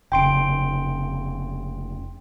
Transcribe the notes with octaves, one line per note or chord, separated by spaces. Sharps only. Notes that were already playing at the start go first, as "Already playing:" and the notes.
F1 C#3 G5 C6 D7